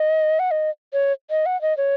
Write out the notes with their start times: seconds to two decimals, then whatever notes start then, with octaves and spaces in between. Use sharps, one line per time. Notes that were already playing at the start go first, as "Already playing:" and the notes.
Already playing: D#5
0.39 F#5
0.51 D#5
0.93 C#5
1.30 D#5
1.46 F#5
1.62 D#5
1.77 C#5